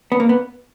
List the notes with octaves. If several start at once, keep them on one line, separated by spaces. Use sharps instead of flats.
B3
A#3
B3